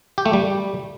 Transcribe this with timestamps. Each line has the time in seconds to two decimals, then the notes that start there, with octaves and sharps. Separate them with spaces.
0.18 G4
0.26 A3
0.33 G3